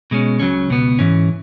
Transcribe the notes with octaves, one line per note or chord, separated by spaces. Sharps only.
B2 G#3 C#4
C#2 C#3 F#3 C#4
C#2 B2 B3
G#2 E3 C#4